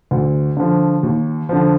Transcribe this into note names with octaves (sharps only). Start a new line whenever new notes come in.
D2
D3 F3
D#2
D3 F3